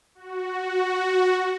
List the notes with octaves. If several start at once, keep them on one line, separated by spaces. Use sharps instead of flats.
F#4